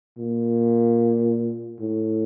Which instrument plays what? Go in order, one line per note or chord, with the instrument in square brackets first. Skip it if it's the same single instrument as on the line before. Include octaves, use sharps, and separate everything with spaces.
[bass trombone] A#2
A2